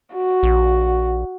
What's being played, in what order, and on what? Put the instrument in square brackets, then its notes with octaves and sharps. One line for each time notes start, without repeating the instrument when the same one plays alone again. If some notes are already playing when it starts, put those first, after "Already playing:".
[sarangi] F#4
[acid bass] A#1